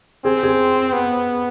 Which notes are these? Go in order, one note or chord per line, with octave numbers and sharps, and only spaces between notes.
C4 G#4
G#4
B3